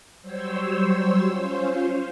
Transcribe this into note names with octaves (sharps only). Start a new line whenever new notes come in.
F#3 G3 C5 C#5 E6
C#4 F4 C5